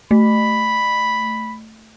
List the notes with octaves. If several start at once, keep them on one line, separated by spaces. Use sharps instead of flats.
A3 B5